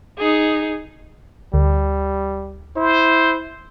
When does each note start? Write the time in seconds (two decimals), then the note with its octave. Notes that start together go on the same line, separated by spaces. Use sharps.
0.18 D#4 G#4
1.54 D2 G3
2.76 E4 C5